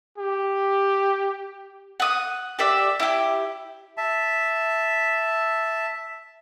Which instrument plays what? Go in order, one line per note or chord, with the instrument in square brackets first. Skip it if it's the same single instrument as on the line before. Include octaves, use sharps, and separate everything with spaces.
[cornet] G4
[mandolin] F#5 D#6
G4 D5 E5
E4 G4
[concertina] E5 A5